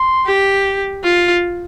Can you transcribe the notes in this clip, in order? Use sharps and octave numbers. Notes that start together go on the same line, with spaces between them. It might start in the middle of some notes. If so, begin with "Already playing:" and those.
Already playing: C6
G4
F4